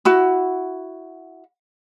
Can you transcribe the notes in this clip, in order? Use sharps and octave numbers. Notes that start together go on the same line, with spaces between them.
E4 F#4